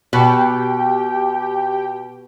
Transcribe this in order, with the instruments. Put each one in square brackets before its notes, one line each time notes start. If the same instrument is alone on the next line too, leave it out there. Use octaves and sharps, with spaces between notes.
[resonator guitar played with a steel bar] B2 [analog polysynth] G4 G5